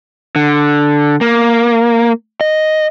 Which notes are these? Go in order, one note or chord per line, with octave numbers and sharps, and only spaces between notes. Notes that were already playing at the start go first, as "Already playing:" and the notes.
D3
A#3
D#5